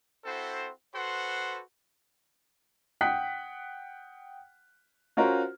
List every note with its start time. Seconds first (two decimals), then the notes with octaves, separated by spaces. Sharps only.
0.25 C4 E4 F#4 A4 C5
0.94 F#4 A4 B4 C5 F#5 C6
3.01 F#5 G5 D#6 F#6 B6
5.17 C#4 F4 F#4 A#4 C5